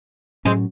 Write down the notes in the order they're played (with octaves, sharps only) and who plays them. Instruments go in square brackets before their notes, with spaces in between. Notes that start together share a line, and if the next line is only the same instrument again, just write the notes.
[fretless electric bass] A2 F#3 C#4 [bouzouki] G#3 C4